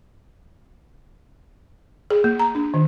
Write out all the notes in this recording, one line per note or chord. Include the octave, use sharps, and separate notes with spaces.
G#4
A#3
A#5
D4
D#3